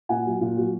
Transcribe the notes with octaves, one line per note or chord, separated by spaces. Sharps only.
A#2 F#5 G#5
F#3
A#2
F#3